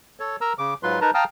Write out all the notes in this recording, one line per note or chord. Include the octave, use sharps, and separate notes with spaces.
A4 C#5
A#4 A#5 E6
C#3 D6
G#2 F#3 F4 B4 C6
D#4 A#4 B4 A5 A#5
F5 G5 A5 A#5 D#6 F6